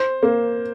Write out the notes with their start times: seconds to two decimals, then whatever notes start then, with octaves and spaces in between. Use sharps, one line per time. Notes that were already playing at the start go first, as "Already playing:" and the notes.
Already playing: C5
0.23 A#3